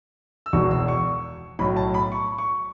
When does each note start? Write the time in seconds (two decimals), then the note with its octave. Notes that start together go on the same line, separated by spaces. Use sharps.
0.46 E6
0.53 E1 E2 B2 C#6
0.71 E6
0.88 C#6
1.59 B1 A2 F#3 B5
1.76 A5
1.94 B5
2.12 C#6
2.38 C#6